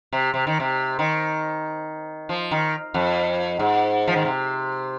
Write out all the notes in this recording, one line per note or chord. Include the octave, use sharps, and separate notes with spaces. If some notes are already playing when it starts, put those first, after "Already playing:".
C3
C3
D#3
C3
D#3
F3
D#3
F2
G#2
F3
D#3
C3